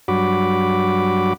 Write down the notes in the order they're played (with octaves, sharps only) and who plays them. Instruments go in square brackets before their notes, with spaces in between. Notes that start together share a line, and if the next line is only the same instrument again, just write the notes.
[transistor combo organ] G2 F#3 F#4 B5 D6